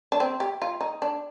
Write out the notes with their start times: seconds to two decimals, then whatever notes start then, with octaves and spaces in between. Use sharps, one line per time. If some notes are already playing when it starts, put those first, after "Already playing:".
0.12 D4
0.20 C4
0.40 G4
0.62 F4
0.81 D#4
1.02 D4